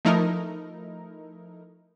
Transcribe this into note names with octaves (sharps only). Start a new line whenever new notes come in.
F3 A3 D#4 E4 A#4